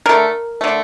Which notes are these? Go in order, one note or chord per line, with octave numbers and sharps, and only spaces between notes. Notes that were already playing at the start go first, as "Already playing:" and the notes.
D3 A3 A#4
D3 A3